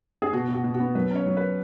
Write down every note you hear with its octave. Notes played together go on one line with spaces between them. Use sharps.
G#4
B2 F#4
B2
F#4
B2
F#4
B3
F#3 B4
C#4 C#5
F#3
B4